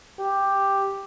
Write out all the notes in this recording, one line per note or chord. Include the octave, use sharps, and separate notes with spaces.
G4